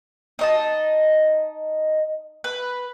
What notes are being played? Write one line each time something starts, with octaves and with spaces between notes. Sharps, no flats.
D#4 D#5 A5
B4